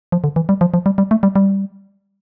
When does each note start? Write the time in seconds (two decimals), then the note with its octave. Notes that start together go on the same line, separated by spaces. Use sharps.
0.12 F3
0.24 D3
0.36 E3
0.49 G3
0.61 F3
0.74 F3
0.86 G3
0.98 G3
1.11 A3
1.23 G3
1.36 G3